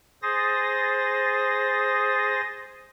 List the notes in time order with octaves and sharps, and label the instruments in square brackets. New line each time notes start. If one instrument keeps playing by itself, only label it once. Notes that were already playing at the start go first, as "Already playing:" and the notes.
[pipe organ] G#4 C5 D#6 A6 A#6